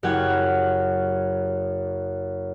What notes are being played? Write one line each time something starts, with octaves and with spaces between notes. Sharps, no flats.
F#1 F#2 G4 F#5 G#6